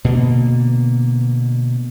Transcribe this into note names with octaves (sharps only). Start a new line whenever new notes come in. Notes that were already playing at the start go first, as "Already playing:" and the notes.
B2 D3 A#3